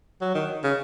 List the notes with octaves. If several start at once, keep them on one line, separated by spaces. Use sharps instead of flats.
F#3
D#3
C#3